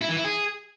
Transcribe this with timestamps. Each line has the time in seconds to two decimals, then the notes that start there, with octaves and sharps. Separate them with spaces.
0.01 E4
0.09 E3
0.17 E4
0.24 G#4